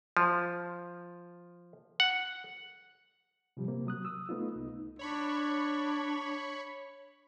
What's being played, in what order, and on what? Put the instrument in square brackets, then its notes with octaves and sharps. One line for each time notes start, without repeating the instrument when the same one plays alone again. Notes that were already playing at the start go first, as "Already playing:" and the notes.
[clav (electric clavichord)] F3
F#5
[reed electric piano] C3 F3 G3
C3 A#3
F#3 D#6 F#6
D#6 E6
A3 B3 D#4 F4
C2 D#4
[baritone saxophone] D4 [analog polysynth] C#5 B5 C#6